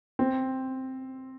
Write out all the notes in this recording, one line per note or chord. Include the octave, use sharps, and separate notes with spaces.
C4